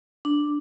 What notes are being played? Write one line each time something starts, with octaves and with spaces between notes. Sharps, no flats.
D4